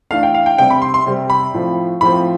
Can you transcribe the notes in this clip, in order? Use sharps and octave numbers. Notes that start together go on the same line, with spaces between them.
E3 A3 D4 F5
G5
F5
G5
C3 G3 C4 G5
B5
C6
C6
C3 G3 C4
B5
A2 F3 C4
A2 F3 C4 B5